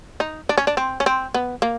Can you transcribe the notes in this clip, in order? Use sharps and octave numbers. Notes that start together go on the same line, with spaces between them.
D#4
D4
C#4
D4
C4
C#4
C4
B3
A#3